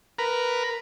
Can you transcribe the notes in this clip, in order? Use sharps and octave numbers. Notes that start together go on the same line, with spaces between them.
A#4 B4